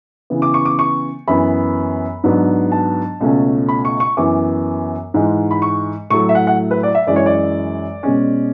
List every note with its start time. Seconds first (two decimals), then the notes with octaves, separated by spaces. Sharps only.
0.30 C#3 E3 B3
0.42 D6
0.54 C#6
0.65 D6
0.79 C#6
1.28 F#2 E3 B3 B5
2.24 G#2 F#3 B3 D4
2.72 A5
3.20 C#2 B2 A3 C#4
3.69 B5
3.85 C#6
4.00 C#6
4.17 F#2 E3 B3 D6
5.14 G#2 E3 G#3
5.51 B5
5.62 C#6
6.10 A2 F#3 A3 C#6
6.29 E5
6.35 F#5
6.47 F#5
6.71 B4
6.83 D5
6.95 E5
7.07 F#2 E3 G#3 D5
7.16 C#5
7.26 D5
8.03 B2 G#3 C#4